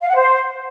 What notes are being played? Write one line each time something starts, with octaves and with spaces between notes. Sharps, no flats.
F5
F#5
C5